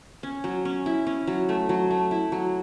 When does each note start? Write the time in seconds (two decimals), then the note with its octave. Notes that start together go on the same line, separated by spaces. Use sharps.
0.23 C#4
0.44 F#3
0.65 C#4
0.86 E4
1.07 C#4
1.27 F#3
1.49 A3
1.69 F#3
1.91 A3
2.11 E4
2.32 F#3